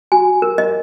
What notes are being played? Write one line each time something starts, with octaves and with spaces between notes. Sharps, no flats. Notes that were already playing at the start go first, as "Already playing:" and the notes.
F#4 G#5
A#4
D#5